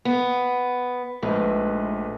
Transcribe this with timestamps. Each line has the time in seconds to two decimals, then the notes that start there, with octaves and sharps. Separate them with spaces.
0.05 B3
1.22 A#1 G#2 A3 B4